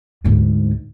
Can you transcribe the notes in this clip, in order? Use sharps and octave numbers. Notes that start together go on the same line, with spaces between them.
D2 G#2